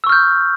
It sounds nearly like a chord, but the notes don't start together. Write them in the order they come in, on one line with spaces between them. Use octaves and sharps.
E6 C#6 F6 G6